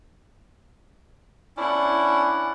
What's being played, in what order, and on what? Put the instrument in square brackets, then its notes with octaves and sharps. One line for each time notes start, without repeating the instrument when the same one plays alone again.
[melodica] C#4 D4 [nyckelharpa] E4 F#5